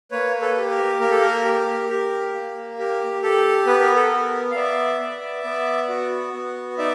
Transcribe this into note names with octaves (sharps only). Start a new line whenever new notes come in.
A#3 B4 C#5
A4 B4
G4
A#4
A#3 A#4
A4
A#4
G4
G4
A#3
G4 A#4
G4 A4
B3 B4
A#4
A4
B3 A#4
F5
B3 D5 E5
B3
B3
F#4
B3
D#4 D5 E5